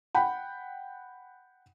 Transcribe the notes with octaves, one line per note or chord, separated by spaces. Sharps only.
F#5 G5 B5